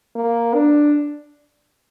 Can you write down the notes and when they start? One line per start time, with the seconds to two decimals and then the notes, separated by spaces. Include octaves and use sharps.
0.15 A#3
0.54 D4